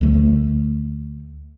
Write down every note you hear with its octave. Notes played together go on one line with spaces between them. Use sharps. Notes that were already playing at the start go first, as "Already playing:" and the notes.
D2 D3 A3